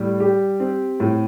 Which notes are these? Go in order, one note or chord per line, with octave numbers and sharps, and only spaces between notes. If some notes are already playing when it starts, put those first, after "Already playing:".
Already playing: A2 G3
G4
C4
A2